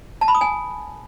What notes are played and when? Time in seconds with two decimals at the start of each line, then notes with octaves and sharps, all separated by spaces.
0.21 A5
0.28 B5
0.35 D#6
0.41 G#5